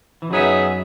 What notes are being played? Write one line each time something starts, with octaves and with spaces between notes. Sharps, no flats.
E3
F#2 F#3 B3 D#4 G#4 C#5 E5